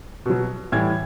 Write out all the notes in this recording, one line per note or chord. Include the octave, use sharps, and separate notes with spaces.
B2 F#3
A2 E3 G3 G#6